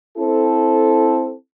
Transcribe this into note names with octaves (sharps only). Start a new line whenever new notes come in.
C4 E4 A4